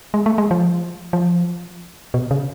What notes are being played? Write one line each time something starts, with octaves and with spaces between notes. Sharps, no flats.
G#3
A3
G#3
F3
F3
B2
C#3